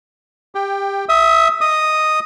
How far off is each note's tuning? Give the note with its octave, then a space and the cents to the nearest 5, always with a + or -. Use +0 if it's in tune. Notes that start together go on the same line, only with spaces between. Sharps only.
G4 +20 G5 +5
E5 +0 D#6 +25
D#5 +0 D#6 +0